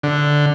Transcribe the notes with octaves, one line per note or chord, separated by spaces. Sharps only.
D3